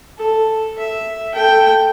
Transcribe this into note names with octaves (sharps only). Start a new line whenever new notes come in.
A4
E5
A4 G5